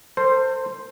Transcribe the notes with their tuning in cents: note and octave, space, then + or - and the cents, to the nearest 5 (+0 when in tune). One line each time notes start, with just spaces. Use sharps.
A4 +45 C5 +0